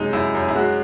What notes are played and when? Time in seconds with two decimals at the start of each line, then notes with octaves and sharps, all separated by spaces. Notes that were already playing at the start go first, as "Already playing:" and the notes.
Already playing: F#2 C3 G#3 D#4
0.13 F#2 E4
0.35 F#2
0.48 E4
0.55 G#3 F#4